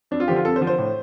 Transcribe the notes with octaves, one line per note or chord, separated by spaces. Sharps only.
F2 D4
F4
D3 F3 G4
F4
F2 A4
C5
D3 F3
C5
A2